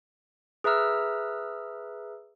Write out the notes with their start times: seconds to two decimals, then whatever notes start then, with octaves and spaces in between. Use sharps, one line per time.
0.64 G#4 B4 E5 A#5 E6 F6